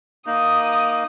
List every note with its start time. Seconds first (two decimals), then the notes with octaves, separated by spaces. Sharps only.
0.27 A#3 D#4 D#6